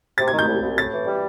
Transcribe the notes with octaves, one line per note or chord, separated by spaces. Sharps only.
C3 A6
G#6
D#3
G6
C2
C2
A2 A6
E3
G3